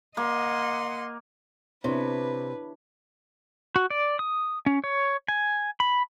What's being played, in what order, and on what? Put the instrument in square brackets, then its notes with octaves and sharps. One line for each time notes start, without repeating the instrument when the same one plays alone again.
[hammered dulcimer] A#3 [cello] D#5 F#5 [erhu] C6
[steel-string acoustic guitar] C3 [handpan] D4 E4 C#5 [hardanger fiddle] B4
[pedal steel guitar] F#4
D5
D#6
C#4
C#5
G#5
B5